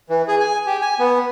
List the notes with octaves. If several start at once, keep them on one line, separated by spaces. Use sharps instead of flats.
E3
G#4
G#5
G4
G#5
B3